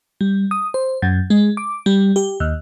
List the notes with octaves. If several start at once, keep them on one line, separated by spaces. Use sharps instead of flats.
G3
D#6
C5
F#2
G#3
D6
G3
G4
D#2